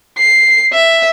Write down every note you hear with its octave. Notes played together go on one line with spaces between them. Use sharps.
C7
E5